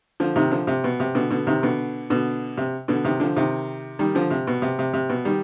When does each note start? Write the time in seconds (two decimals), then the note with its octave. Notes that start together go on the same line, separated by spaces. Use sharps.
0.20 D3 F3
0.36 C3 D#3
0.51 D3 F3
0.67 C3
0.84 B2
1.00 C3
1.15 B2 D3
1.30 B2 D3
1.47 C3 D#3
1.63 B2 D3
2.10 B2 D3
2.58 C3
2.88 B2 D3
3.05 C3 D#3
3.20 D3 F3
3.37 C3 D#3
3.99 D#3 G3
4.15 D3 F3
4.31 C3
4.47 B2
4.62 C3
4.79 C3
4.94 C3
5.10 B2
5.25 D#3 G3